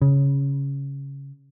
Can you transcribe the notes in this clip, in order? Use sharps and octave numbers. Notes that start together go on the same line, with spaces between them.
C#3